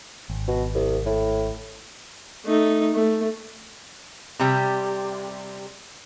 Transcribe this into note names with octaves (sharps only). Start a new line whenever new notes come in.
G#1
B2
C2
A2
A3 D#4
A3
C3 G3